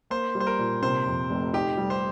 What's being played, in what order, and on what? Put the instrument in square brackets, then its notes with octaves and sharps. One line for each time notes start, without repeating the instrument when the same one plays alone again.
[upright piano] A#3 [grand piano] C5
[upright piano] G3
[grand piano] C5
A#4
[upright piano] A#2
[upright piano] C3 [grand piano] C5
[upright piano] F2
F1
[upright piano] D#4 [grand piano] G4
[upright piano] G3
[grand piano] C5